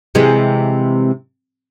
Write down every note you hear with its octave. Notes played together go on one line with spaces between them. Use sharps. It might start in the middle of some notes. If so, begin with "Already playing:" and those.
C3 E3 G#3